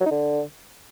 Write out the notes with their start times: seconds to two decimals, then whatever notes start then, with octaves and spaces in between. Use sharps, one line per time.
0.01 F#3
0.06 D#4
0.11 D3